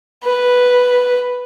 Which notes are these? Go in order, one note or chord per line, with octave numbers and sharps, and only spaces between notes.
B4